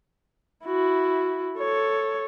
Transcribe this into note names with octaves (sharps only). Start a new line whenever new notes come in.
E4 F#4
A4 C#5